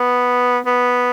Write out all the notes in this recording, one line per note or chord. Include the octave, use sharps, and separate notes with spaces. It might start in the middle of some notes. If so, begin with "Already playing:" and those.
Already playing: B3
B3